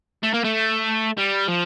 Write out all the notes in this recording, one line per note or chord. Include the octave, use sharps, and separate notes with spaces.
A3
A#3
A3
G3
F3